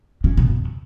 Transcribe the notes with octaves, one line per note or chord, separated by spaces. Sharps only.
C#3
B2
E2